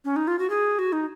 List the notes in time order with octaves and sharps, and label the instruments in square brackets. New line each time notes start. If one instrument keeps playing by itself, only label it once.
[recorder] C#4
D#4
F4
F#4
G#4
F#4
D#4